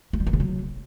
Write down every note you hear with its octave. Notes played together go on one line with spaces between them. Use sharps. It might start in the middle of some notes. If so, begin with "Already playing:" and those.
A3
G3
E3
C#3
F#3